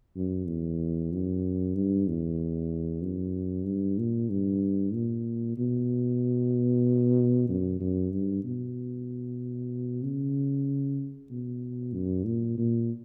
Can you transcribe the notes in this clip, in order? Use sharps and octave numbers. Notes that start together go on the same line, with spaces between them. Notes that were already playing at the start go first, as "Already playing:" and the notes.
F#2
E2
F#2
G2
E2
F#2
G2
A#2
G2
A#2
B2
F#2
F#2
G2
B2
C#3
B2
F#2
A#2
A#2